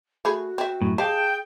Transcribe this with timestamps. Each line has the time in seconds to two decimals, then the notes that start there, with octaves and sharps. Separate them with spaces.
0.25 A3 F#4 G#4 B5
0.58 C4 E5
0.82 F#2 A2
0.98 G4 G#4 D#5 F5 G5 A5